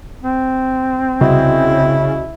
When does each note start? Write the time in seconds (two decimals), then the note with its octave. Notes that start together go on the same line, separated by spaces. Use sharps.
0.23 C4
1.21 C2 C#3 E4 F#4 D#5